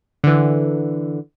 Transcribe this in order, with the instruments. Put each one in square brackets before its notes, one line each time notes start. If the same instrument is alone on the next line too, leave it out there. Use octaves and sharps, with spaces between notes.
[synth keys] D3 E3